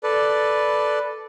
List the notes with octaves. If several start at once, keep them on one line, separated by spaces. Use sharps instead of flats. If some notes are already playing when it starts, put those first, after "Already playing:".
A4 B4 D5